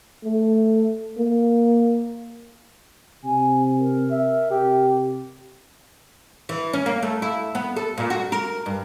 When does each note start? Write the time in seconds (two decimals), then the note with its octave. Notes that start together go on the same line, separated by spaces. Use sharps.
0.25 A3
1.18 A#3
3.24 C3 G#5
3.78 A#4
4.11 E5
4.51 C3 G4
6.49 E3
6.73 C#4
6.86 A#3
7.03 A3
7.22 E4
7.55 B3
7.76 A4
7.98 A#2
8.10 F#4
8.32 A#4
8.66 G2